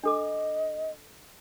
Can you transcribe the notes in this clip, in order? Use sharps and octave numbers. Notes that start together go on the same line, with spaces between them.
D4 A4 D#5 D6